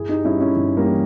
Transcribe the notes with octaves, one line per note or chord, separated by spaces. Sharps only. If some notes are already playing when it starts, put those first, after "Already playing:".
Already playing: G1 E4 G#4
D#4 G4
G2 C#4 E4
C#4 E4
G1
G3 A#3
E3